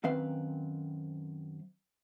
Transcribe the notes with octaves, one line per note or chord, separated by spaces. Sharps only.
F#2 D#3 C4 B4 F5